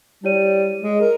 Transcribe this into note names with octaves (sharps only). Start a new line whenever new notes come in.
G3 E4 C#5 D#7
G#3
A#4